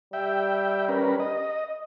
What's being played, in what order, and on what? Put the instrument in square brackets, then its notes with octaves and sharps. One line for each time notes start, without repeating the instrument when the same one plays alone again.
[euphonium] G3 [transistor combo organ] E5 G5
[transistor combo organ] C#4 A#4 B4
D#5